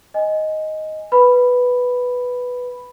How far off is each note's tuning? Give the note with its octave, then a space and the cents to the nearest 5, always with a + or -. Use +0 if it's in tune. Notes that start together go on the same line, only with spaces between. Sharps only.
D#5 +5 G#5 +0
B4 +0 B5 +0